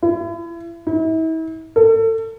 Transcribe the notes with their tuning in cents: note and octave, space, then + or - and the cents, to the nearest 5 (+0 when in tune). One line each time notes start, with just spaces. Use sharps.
E4 +35
E4 -40
A4 +30